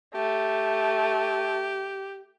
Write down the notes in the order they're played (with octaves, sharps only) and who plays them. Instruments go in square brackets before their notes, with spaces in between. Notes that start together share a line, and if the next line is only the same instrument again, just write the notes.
[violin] A3 [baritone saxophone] G4